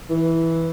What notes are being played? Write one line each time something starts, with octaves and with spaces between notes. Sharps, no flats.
E3